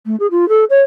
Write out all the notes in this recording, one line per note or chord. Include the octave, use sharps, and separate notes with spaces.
A3
G#4
F4
A4
C#5